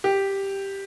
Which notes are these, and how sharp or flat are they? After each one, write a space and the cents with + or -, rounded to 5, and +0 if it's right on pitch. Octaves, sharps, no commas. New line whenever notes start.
G4 +0